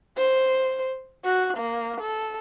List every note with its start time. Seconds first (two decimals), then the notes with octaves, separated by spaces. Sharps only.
0.17 C5
1.24 F#4
1.57 A#3
2.00 A4